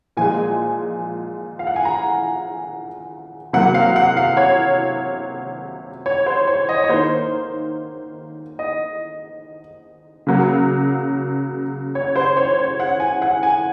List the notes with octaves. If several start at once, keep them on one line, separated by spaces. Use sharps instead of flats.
A#2 F3 G#3 G#5
F5
F#5
G#5
A#5
C3 F#3 A#3 F#5
F5
F#5
F5
C#5
C#5
C5
C#5
D#5
C#5
D#3 A#3 C5
D#5
C#3 F#3 A#3
C#5
C5
C#5
C#5
F#5
G#5
F#5
G#5